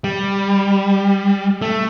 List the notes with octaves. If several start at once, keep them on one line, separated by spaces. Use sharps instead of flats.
G3
A3